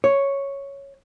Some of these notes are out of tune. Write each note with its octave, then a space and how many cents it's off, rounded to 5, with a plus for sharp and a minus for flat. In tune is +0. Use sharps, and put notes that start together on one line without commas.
C#5 +0